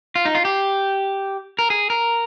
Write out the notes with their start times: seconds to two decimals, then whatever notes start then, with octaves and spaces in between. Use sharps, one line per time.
0.15 F4
0.25 D#4
0.35 F4
0.45 G4
1.59 A#4
1.70 G#4
1.90 A#4